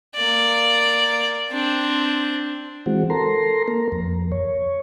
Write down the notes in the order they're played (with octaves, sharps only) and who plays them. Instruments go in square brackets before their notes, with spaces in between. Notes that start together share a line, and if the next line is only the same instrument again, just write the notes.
[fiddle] A#3 D5
C4 D4
[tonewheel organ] E3 G#3 C4 F#4
A4 A#4 A#5 C6
A#3 A#4
F2
C#5